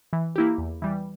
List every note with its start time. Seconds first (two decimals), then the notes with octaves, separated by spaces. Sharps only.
0.13 E3
0.36 A#3 E4 G4
0.58 E2
0.82 E3 G3